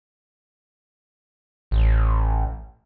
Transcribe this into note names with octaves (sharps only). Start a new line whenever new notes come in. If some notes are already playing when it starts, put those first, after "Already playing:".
A1